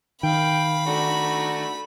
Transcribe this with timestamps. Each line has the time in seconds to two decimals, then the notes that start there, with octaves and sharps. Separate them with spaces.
0.23 D#3 F5 G5 B5
0.86 A3 D4 D#4 F#4